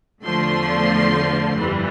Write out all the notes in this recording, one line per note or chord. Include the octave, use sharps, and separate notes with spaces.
E2 D3 F3 A3 C6
G1 F2 E3 G3